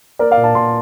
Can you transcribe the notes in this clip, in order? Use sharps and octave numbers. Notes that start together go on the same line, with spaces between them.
A#3 A#4 D5
D5 F5
A#2
F5 A5
A#2 A5 C6